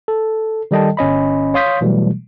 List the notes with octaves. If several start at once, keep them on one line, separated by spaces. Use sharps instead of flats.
A4
D#3 G3 A4 D#5 G5 A5
G1 C#4 D#5 B5
C#5 F5 C6 D#6 G6 B6
B2 E3 F#3 G3 A3